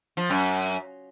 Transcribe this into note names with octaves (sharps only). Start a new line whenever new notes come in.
F3
F#2